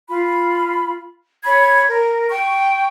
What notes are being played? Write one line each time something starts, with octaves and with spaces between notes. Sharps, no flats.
F4 B5
C#5 B5 G#6
A#4
G5 C#6